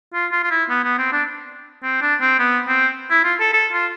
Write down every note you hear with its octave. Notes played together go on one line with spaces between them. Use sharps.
F4
F4
F4
E4
B3
B3
C4
D4
C4
D4
C4
B3
C4
E4
F4
A4
A4
F4